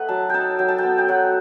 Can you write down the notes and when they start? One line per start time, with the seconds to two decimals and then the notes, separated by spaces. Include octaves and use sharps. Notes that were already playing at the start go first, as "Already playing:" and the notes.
Already playing: A3 D#4 A4 B4 F#5
0.09 F#3 A5
0.30 D#4 G5 A5
0.59 F#3 G5
0.68 A5
0.78 B3 G5
0.98 G5
1.08 F#3 F#5